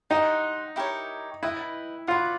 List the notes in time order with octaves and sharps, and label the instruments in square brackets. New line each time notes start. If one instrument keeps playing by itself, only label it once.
[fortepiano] D#4 [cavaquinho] G4 C5 D#5 F#5
[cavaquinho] E4 G4 A#4 C#5
[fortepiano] E4 [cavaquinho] B4 D#5 G5
[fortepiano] F4 [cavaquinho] F#4 B4 D5 F#5